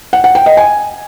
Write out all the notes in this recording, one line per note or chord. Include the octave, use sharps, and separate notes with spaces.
F#5
F#5
G5
D#5
G#5